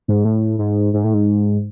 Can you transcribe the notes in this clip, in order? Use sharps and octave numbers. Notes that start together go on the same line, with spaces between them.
G#2
A2
G#2
G#2
A2
G#2